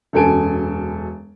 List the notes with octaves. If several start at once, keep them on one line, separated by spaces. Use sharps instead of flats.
E1 F#2 A4 G#5 D7